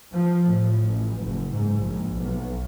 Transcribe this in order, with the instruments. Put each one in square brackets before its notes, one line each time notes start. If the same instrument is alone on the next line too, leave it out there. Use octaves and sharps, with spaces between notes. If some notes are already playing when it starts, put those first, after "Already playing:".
[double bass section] F3
A2
A1
F#1
G#2
A#1
B1